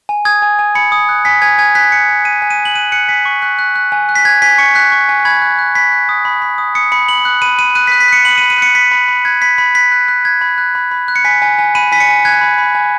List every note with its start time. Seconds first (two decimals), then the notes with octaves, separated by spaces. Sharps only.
0.09 G#5
0.25 D#6 G#6
0.42 G#5
0.59 G#5
0.75 B5 C#7
0.92 D#6
1.09 F#6
1.25 G#5 B6
1.42 G#5 G#6
1.58 G#5 G#6
1.75 F#6 B6
1.92 F#6 C#7
2.09 G#5
2.25 G#5 D#7
2.42 G#5
2.50 D#7
2.59 G#5
2.65 F#7
2.75 F#6 D#7
2.92 F#6 C#7
3.09 G#5 B6
3.25 C#6
3.42 F#6
3.59 F#6
3.76 F#6
3.92 G#5
4.09 F#6
4.15 B6
4.25 G#5 G#6
4.42 G#5 B6
4.58 C#6 C#7
4.75 F#6 B6
4.92 C#6
5.09 G#5
5.25 B5 G#6
5.42 F#6
5.59 F#6
5.75 B5 B6
5.92 F#6
6.09 D#6
6.25 B5
6.42 B5
6.58 D#6
6.75 D#6 C#7
6.92 B5 C#7
7.08 B5 F#7
7.25 F#6
7.42 B5 D#7
7.58 B5 D#7
7.75 F#6 D#7
7.87 B6
7.92 F#6
8.00 B6
8.08 F#6 C#7
8.25 B5 F#7
8.38 D#7
8.42 B5
8.50 D#7
8.58 F#6 C#7
8.75 B5 B6
8.92 B5
9.08 B5
9.25 F#6 G#6
9.42 B5 B6
9.58 B5 B6
9.75 F#6 B6
9.92 F#6
10.08 F#6
10.25 F#6 G#6
10.41 B5
10.58 F#6
10.75 B5
10.91 B5
11.08 F#6
11.16 C#7
11.25 G#5 B6
11.42 G#5
11.58 G#5
11.75 B5 D#7
11.92 G#5 B6
12.00 C#7
12.09 G#5
12.25 F#6 G#6
12.41 B5
12.58 B5
12.75 G#5